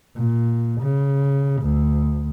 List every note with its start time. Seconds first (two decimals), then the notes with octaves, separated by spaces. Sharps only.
0.16 A#2
0.81 C#3
1.62 D2